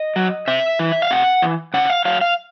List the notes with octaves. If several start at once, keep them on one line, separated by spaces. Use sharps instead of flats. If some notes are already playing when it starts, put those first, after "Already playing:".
Already playing: D#5
F#3
C3 E5
E3
F5
C3 F#5
E3
C#3 F#5
F5
F#3 F5
F5